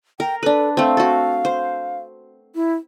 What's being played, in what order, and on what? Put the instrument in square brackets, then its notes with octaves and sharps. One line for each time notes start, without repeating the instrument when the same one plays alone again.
[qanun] A#4 [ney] G5
[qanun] D4 B4 [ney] A4
[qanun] A3 C4 [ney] F5
[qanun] F#4 A4
C5
[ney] E4